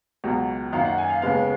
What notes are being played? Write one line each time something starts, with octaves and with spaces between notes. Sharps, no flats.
C#2 B2 F#3
F#2 D#3 A#3 F5
F#5
G#5
F5
D#2 C#3 G#3 B3 F5